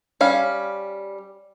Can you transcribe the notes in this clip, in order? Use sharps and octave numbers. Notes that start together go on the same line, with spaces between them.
G3 C#4 F5